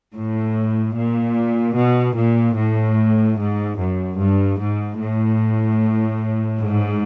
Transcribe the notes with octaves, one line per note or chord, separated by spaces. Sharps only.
A2
A#2
B2
A#2
A2
G#2
F#2
G2
G#2
A2
G#2